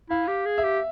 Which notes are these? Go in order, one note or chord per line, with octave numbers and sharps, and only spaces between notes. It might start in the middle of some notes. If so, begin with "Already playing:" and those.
E4 F5
G4
G#4
E5
G4